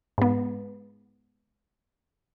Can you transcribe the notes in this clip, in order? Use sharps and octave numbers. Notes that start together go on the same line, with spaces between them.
G#2 B3